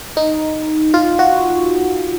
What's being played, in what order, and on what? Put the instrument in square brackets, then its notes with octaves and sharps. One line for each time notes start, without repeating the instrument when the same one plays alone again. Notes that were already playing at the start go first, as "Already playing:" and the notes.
[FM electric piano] D#4
F4
F#4